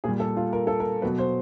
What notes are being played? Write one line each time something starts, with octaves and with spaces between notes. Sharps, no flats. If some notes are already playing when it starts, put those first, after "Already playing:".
A#2 G3 G#4
A4
F4
A#4
A4
A#4
B2 F#3 B4
C5